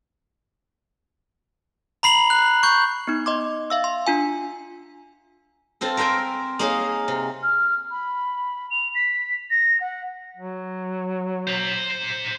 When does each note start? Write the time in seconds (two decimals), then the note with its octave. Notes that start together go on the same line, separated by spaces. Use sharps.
2.03 A#5 B5 C7 F7 F#7
2.30 F#6
2.63 C#6 G6
3.07 B3 D#4
3.26 D#5 C6 D6
3.70 E5 F5 E6
3.84 C6
4.06 D4 F4 G#5
5.81 C4 F4 A4
5.97 A#4 C5 E5 G5 G#5
6.59 A#3 D#4 G#4 C#5 F5
7.08 C3
7.43 F6
7.91 B5
8.71 F7
8.95 B6
9.51 A#6
9.80 F#5
10.37 F#3
11.47 C5 A#5